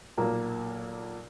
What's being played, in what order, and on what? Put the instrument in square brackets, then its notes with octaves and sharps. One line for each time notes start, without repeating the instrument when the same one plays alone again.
[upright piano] B1 A#2 A#3